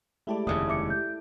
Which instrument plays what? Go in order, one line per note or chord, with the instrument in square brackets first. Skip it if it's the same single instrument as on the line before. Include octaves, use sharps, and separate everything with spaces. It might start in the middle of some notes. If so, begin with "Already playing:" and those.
[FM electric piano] G#3 A3 G4 [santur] E4 A4 D5
[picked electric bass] F1 D#2 C#3 [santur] D5 [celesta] D#6
[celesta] E5 D6 C#7
G6